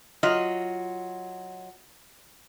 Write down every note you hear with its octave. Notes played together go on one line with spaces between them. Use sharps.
F#3 F4 D#5